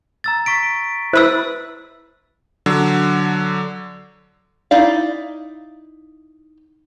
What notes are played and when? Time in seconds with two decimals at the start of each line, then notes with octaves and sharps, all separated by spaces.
0.24 A#5 E6 A6
0.46 C#6 B6 D7
1.13 E4 B4 C5 E6
2.66 D3 F#3
4.71 D#4 E4 D5 F5